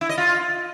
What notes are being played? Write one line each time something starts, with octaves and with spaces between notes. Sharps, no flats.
E4
D#5
F4